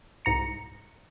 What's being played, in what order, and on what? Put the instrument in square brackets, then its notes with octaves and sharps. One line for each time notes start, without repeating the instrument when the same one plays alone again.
[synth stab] C2 G#2 A#5 C#7